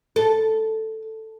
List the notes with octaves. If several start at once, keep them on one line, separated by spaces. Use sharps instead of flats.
A4